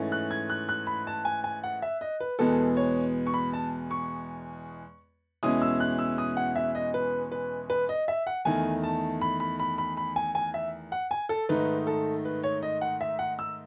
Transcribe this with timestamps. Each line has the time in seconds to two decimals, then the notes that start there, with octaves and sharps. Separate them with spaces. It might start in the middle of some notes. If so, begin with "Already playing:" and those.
Already playing: G#2 E3 A3 C#4
0.12 F#6
0.31 G#6
0.50 F#6
0.69 F#6
0.87 B5
1.07 A5
1.25 G#5
1.44 G#5
1.64 F#5
1.82 E5
2.01 D#5
2.20 B4
2.39 E2 B2 G#3 B3 A4
2.77 C#5
3.27 C#6
3.34 B5
3.53 A5
3.91 C#6
5.43 E2 B2 G#3 C#4 E4 D#6
5.62 E6
5.80 F#6
5.99 E6
6.18 D#6
6.37 F#5
6.56 E5
6.75 D#5
6.94 B4
7.32 B4
7.70 B4
7.89 D#5
8.08 E5
8.27 F#5
8.45 E2 D#3 A3 G#5
8.83 A5
9.21 B5
9.40 B5
9.59 B5
9.78 B5
9.97 B5
10.16 G#5
10.35 G#5
10.54 E5
10.92 F#5
11.11 G#5
11.29 A4
11.49 G#2 D#3 A3 D#4 B4
11.87 A4
12.25 B4
12.43 C#5
12.63 D#5
12.81 F#5
13.01 E5
13.19 F#5
13.39 E6